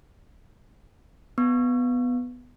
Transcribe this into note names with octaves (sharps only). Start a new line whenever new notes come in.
B3